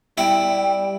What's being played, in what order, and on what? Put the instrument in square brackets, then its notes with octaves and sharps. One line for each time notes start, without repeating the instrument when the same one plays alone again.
[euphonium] G3 [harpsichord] E4 [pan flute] G5